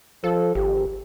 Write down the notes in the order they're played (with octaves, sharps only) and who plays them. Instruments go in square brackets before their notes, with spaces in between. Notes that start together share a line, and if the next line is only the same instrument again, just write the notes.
[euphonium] F3 [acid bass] A4
[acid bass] G#1 [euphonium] G4